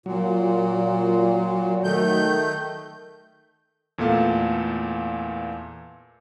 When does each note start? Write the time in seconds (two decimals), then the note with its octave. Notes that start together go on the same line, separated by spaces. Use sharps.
0.06 A#2 F#3
1.84 D#3 A3 G6
3.98 E2 A#2 A3 A4 F5